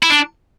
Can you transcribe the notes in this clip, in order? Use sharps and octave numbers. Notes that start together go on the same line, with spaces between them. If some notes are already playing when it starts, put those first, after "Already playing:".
E4
D4